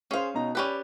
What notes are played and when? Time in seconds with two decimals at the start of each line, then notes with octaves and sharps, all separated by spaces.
0.11 C#4 G#4 C5 F5
0.34 B2 D#4 A#5
0.55 C#4 G4 B4 D5 B5 F#6